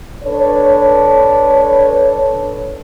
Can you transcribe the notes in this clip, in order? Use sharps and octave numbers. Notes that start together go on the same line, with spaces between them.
D4 A4 B4 C#5